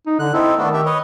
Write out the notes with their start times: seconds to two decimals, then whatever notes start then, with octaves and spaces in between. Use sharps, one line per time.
0.07 D#4
0.19 D3 F#6
0.33 C4 D#4 E4 A4
0.58 D#3 A3 B3 D4
0.74 G4 E5
0.86 B4 C#5 D#5